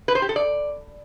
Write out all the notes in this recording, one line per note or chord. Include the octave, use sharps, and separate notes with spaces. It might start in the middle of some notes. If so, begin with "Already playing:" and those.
B4
C5
G4
A4
D5